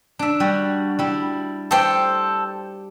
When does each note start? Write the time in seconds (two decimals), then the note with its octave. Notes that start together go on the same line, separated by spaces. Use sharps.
0.19 D4 E5
0.40 G3 F#4
0.99 G3 E4
1.71 G4 A4 C5 G5